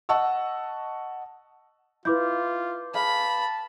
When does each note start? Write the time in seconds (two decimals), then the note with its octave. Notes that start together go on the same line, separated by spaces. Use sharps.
0.09 D#5 F#5 A5 C#6 E6
2.05 E4 F4 B4 D6 G6
2.94 G#4 F5 A5 B5